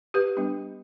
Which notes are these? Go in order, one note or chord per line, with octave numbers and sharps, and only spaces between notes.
G4 B4
G3 B3 D4